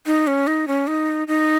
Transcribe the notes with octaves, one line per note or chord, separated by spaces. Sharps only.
D#4
C#4
D#4
C#4
D#4
D#4